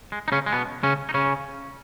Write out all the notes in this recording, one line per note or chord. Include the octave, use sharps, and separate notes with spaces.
G#3
D#4
C#3 C#4
G#3
B2 B3
C#3 C#4
D#4
C#3 C#4